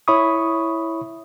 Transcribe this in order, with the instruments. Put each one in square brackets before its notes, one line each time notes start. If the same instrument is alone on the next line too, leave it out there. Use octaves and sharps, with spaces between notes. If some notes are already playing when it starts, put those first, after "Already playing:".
[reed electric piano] E4 C#5 E5 B5 C#6 D#6